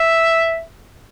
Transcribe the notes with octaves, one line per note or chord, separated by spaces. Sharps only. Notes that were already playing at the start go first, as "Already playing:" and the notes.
Already playing: E5